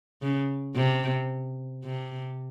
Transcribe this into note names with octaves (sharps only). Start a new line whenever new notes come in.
C#3
C3
C3